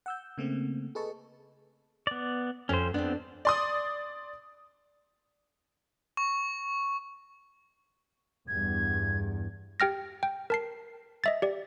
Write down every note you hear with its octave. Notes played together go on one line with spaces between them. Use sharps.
F#5 E6 G6
C#3 A3 A#3 C4
G#4 A4 B4 D#5 A5 C#6
B3 D5
F2 C#4 C5
F2 B3 C4 D4
D5 C6 D#6
C#6
E2 G2 G#6
G4 G5 F6 A#6
G5
A#4 A5 C7
D#5 E5 A6
G4 D5